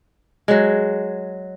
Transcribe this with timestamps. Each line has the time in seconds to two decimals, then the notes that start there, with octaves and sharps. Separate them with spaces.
0.48 F#3 G#3